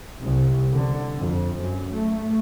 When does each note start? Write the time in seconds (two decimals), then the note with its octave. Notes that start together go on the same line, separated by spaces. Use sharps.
0.22 C2
0.74 D3
1.17 F2
1.60 F#2
1.90 A3